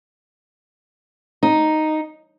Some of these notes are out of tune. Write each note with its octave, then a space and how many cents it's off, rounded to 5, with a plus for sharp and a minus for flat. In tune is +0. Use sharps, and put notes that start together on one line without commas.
D#4 -5